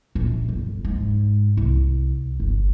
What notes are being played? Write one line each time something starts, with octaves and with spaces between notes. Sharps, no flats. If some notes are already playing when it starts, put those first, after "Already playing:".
A#1
G1
G#2
C2
G1